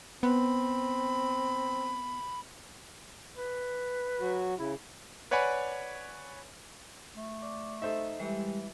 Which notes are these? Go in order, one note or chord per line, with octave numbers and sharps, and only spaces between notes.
B3 C4 B5
B4
F#3 F#4
C#3 E4
B4 C#5 D5 F#5 G#5 B5
A3
D5
D#4 A4 C5 E5
E3 G3 G#3 G4